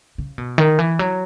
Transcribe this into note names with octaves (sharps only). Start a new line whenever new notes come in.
C#3
B2
D#3
E3
F#3